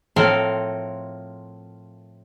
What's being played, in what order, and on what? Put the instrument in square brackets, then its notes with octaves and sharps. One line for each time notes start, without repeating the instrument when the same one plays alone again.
[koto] A2 F3 C4 A4 A#4 F5